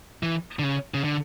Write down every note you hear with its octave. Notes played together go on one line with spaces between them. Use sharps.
E3
D3
C#3
C#3
D3